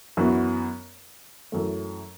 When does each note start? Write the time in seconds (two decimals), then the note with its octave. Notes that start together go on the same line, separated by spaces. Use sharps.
0.17 F#2 E3 B3 F#4
1.52 F#2 E3 A3